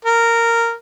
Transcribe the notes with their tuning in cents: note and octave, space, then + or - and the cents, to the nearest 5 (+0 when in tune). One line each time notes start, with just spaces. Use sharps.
A#4 -10